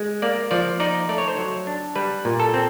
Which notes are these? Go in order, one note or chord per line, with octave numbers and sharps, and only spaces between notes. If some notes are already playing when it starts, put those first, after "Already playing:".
Already playing: G#3
A#3 D5
F3 D5
D#4 D5
A3 D5
C#5
C5
F#3 C#5
D4
G3 B4
A#2
A4
C4